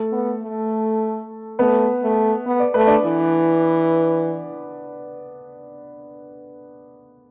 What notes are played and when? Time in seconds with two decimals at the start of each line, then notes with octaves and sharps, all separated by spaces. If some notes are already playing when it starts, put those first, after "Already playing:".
Already playing: A3 A4
0.12 B3
0.42 A3
1.59 A3 B3 B4
2.03 A3
2.46 B3
2.60 D5
2.74 A3 B4
2.87 D4 D5
3.05 E3